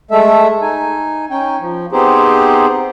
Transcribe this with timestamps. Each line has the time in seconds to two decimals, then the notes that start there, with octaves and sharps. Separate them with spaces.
0.11 G#3 A3 A4 E5
0.62 D#4 G#5
1.31 C#4 D#4 G5
1.60 F3
1.92 B3 C4 D#4 G4 G#4 C5